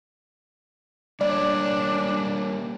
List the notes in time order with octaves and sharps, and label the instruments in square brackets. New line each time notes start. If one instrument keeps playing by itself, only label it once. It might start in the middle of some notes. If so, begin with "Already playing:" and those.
[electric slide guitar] G3 A#3 C#5 [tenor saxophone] D4 [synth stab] D5